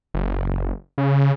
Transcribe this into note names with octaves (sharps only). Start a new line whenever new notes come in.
F#1
C#3